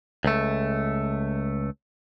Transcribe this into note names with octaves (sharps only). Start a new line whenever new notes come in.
C#2 A3